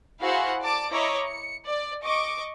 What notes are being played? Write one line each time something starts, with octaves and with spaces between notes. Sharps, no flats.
E4 F#4 G#4 C5 F5 F#5
D5 A5 D6 D7
E4 C#5 D#5 A#5 D6
C#7
D5
D#5 C#6 D6